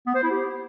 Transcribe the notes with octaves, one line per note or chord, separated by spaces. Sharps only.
B3
C5
E4
G4